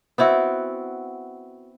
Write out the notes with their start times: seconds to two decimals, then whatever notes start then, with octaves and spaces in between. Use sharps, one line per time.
0.18 B3 C4 E4 F#4